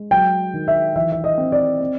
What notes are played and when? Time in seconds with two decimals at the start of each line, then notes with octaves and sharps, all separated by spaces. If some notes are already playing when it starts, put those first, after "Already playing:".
Already playing: G#3
0.11 F#3 G5
0.54 D#3
0.68 E5
0.96 E3 E5
1.12 E5
1.24 D#5
1.38 C4
1.52 D5
1.81 C4